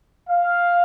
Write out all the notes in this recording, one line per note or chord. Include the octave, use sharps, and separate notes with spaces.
F5